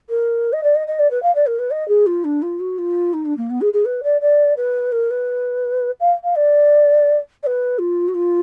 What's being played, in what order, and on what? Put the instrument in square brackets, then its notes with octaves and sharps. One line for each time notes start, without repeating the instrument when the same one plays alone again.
[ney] A#4
D#5
D5
D#5
D#5
D5
B4
F5
D5
A#4
B4
D#5
G#4
F4
D4
F4
F#4
F4
D#4
D4
A#3
B3
G#4
G#4
B4
D5
D5
B4
A#4
B4
F5
F5
D5
D5
B4
F4
F#4
F4